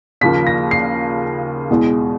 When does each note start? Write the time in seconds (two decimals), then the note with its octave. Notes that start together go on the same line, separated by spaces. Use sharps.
0.21 D#2 C#3 F3 A#3 B6
0.47 A#6
0.71 C7
1.70 E2 B2 G#3